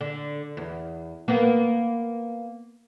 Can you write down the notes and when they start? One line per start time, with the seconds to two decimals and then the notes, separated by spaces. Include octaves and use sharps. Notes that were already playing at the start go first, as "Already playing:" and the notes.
0.01 D3
0.57 E2
1.28 A#3 B3